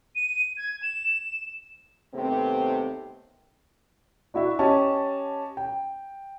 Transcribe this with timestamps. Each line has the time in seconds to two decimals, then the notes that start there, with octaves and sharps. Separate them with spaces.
0.15 D#7
0.57 G#6
0.82 E7
2.14 D#2 C3 A3 B3 C4
4.34 D4 E4 F#4 E5
4.59 C#4 G4 D#5 A5
5.57 G5